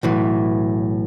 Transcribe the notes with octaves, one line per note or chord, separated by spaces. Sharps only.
B1 A2 E3